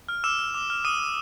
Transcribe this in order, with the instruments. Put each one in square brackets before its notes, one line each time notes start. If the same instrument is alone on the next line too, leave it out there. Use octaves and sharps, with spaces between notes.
[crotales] F6
D6 E6 E7
F6
D6
F6
D6 D#6 D#7
D6